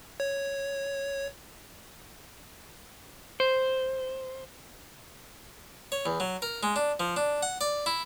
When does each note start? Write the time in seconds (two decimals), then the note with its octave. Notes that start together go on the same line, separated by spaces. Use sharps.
0.20 C#5
3.40 C5
5.92 C#5
6.06 E2
6.20 F#3
6.42 A#4
6.63 G#3
6.76 D4
7.00 F3
7.17 D4
7.43 F#5
7.61 D5
7.86 E4